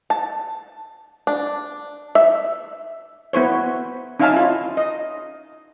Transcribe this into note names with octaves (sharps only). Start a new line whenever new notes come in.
A5
D4
E5
B3 E4 C5 C#5
C#4 D#4 E5 F5 G#5 A5
E4 F4
D#5